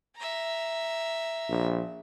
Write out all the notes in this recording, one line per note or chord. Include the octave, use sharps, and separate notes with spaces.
E5 A#5
A#1